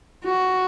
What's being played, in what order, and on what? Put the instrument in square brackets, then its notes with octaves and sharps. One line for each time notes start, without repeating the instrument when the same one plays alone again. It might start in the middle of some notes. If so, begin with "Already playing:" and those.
[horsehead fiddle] F#4